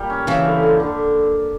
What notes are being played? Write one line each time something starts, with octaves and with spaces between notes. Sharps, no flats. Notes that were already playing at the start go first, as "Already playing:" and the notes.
Already playing: A#2 G3 G4
C#4
C#3 E3 C#4
D3
D3
D3